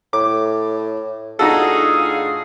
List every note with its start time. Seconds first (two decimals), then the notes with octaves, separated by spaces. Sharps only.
0.13 A2 D6
1.39 A2 D4 D#4 F4 F#4 G#4 A4